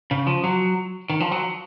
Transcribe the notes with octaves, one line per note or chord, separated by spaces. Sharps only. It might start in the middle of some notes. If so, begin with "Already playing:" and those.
C#3
F3
F#3
D#3
F3
F#3